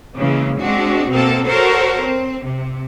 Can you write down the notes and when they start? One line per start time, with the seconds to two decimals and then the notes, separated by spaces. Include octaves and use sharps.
0.18 C#3 E3 G#3 A#3
0.59 G#3 C4 D4 F#4
1.09 B2 A#3 C4 A4
1.46 F#4 A4 A#4 C5 C#5
1.99 C4
2.45 C3